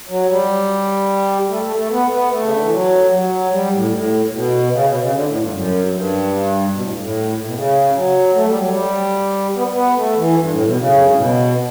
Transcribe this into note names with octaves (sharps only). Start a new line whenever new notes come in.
F#3
G3
A3
A3
A3
B3
B3
A3
C#3
D3
E3
F#3
G3
F#3
G3
A2
G2
A2
A2
B2
C#3
B2
C#3
D3
A2
G2
F#2
G2
B2
A2
G2
A2
A2
B2
C#3
F#3
A3
G3
F#3
G3
B3
B3
A3
E3
G2
A2
B2
C#3
F#2
G2
A2
B2